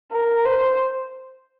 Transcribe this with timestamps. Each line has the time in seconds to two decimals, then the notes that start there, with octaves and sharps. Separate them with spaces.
0.12 A#4
0.45 C5